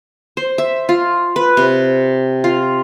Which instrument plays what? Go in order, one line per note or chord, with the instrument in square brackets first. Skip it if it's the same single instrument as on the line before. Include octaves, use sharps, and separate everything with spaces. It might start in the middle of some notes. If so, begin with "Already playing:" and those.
[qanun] C5
E5
F4
B4
C3
F4